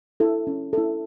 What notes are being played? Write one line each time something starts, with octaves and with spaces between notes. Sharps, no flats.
E4 A4
C#4
E4 A4